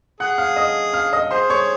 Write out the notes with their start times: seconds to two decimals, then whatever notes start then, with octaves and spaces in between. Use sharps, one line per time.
0.20 G#4 F#5 F#6
0.38 F5 F6
0.56 D#5 D#6
0.94 F5 F6
1.13 D#5 D#6
1.31 G#4 C5 C6
1.50 C#5 C#6